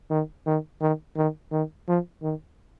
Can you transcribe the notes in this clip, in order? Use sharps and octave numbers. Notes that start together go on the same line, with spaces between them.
D#3
D#3
D#3
D#3
D#3
F3
D#3